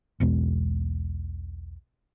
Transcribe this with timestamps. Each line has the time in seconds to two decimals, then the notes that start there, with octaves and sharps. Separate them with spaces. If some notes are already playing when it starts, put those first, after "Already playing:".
0.20 B1 E2 B2 G#3